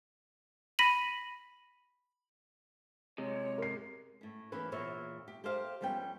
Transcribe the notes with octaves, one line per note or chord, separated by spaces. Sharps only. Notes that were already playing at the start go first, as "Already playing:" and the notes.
B5 A#6 B6 D#7 F#7
C3 G#3 C#5
A#4 C7
A2 C#4
E3 A#3 B3 C#4 B4
E2 A#2 A#3 E4 C#5
G4
G4 A4 A#4 C5 F5
F2 G3 B3 C#4 G5